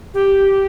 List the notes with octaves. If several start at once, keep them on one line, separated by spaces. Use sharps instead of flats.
G4